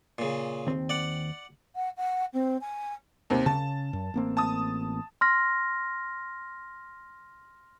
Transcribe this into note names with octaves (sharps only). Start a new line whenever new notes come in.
A#2 C#3
D#2 C4
D5 F#5
F#5
F#5
C4
G#5
D#2 C3 C4
C#3 A5
F#2
A1 A#3 C4
A5 D#6
C6 F6 A#6